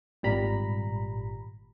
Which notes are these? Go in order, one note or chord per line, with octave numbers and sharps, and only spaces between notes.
G#1 A#2 G3 A#5 B5